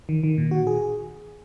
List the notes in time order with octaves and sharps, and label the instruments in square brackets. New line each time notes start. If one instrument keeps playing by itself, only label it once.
[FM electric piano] D#3
D#3
A#2
F#4
G#4